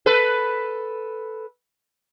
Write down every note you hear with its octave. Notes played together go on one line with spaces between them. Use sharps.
A4 B4